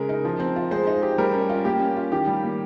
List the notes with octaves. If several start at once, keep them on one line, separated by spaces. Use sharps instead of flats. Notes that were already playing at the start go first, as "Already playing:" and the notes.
Already playing: C#3 G#3 A#4
D#4
F3
C4
F4
G#3 C5
D#4
G4
G3 A#4
C#4
F4
A#3 G4
C#4
F4
D#3 G4
G3
A#3